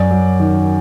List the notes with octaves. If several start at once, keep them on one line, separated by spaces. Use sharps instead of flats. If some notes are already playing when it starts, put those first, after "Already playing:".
Already playing: F#2 F#3 D5
F#3
D#3